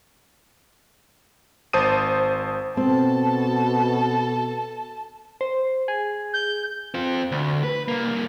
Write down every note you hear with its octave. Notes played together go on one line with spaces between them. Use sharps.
G#1 C5 A5 D#6 D#7
B2 C4 A4 A5
C5
G#4
G6
C4 F4
D2
B4
C2 A#3